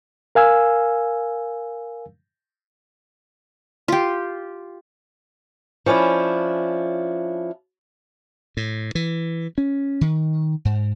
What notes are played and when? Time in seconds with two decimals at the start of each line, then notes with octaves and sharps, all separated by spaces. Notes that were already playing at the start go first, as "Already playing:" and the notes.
0.35 A#4 F5 G#5 E6
3.88 F4 G4
5.86 F3 C#4 D4 E4
8.57 A2
8.95 E3
9.58 C#4
10.01 D#3
10.65 G#2